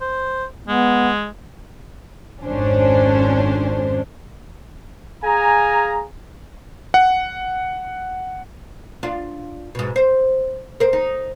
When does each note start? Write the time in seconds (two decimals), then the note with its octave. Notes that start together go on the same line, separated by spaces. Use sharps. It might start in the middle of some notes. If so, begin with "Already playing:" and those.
0.01 C5
0.68 G#3 B3
2.43 G#1 F2 G#2 C#4 D4 C5
5.23 G#4 F5 G#5 A#5
6.94 F#5
9.03 D4 F4
9.75 G#2 B2
9.96 C5
10.80 A#4 C5
10.93 D#4